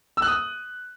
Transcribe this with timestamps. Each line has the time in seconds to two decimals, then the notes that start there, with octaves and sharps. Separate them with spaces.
0.17 E6
0.22 F#6
0.27 D#6